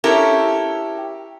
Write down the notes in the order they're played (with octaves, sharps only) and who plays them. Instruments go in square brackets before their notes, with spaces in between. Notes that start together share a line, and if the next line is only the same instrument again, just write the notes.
[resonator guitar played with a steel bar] C#4 E4 [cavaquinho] G4 A4 A#4